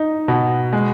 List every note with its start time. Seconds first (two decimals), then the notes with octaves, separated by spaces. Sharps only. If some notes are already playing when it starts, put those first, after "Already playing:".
Already playing: D#4
0.28 B2
0.73 G#3